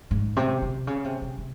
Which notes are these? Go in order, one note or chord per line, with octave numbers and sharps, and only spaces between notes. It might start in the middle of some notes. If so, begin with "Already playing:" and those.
G#2
C3
C3
C#3
C3
C3
C3